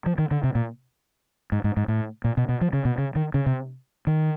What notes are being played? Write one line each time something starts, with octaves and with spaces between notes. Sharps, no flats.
F3
D#3
D3
C3
A#2
G#2
G#2
G#2
A2
A#2
B2
B2
F3
C#3
B2
C#3
D#3
C#3
C3
D#3